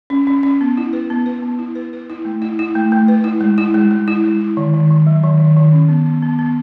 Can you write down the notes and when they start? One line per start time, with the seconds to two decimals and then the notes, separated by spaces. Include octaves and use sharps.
0.10 C#4
0.27 C#4
0.43 C#4
0.61 B3
0.77 E4
0.93 B4
1.10 B3
1.26 B4
1.42 B3
1.59 E4
1.75 B4
1.93 B4
2.10 E4
2.25 A3
2.42 E4
2.59 E4
2.75 A3
2.92 A3
3.08 B4
3.24 E4
3.41 G#3
3.58 E4
3.74 G#3
3.91 G#3
4.08 E4
4.24 G#3
4.41 E4
4.57 D#3
4.74 D#3
4.90 D#3
5.07 F#3
5.23 D#3
5.40 D#3
5.57 D#3
5.72 C#4
5.89 B3
6.06 B3
6.22 B3
6.39 B3